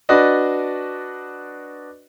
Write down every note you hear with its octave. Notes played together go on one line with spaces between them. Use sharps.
D4 F#4 B4 D5 D#5